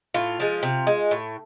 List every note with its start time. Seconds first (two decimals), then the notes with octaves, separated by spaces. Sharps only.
0.14 A2 F4
0.40 F3 G#3
0.63 C3
0.87 G#3
1.11 A2